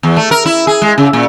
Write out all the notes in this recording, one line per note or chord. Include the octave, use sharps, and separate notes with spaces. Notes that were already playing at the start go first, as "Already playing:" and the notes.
E2
A3
A#4
E4
G#4
G#3
C#3
A#2